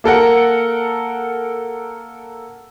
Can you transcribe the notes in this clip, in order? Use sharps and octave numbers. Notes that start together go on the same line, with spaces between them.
A#3 A4 A#4 F#5